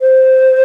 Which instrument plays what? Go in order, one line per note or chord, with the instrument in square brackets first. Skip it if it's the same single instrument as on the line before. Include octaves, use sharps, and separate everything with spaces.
[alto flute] C5